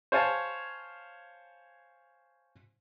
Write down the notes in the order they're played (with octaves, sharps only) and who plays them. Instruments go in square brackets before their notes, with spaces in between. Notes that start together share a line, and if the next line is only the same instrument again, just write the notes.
[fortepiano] C5 C#5 F5 G#5 A5